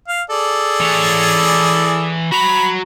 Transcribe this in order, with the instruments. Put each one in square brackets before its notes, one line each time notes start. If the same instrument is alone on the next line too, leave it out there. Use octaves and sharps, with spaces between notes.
[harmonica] F5
G#4 A4 D5
[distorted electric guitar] E3 C#5
[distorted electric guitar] F#4 A#5 [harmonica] B5